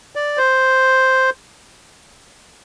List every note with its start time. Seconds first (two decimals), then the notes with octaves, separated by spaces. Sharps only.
0.15 D5
0.37 C5